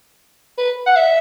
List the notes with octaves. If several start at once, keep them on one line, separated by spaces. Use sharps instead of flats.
B4
F#5
E5